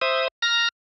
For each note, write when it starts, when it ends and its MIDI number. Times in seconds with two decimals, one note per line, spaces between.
0.01 0.28 72
0.01 0.28 76
0.01 0.28 87
0.42 0.69 82
0.42 0.69 89
0.42 0.69 94